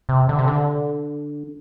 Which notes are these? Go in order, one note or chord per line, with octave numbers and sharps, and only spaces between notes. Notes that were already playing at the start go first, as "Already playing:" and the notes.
C3
D3
C3
D3